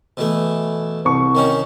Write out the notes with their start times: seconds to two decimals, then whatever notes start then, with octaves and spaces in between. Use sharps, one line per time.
0.17 B2 E3 A3
1.05 C2 C#6
1.35 D#3 C#4 D#4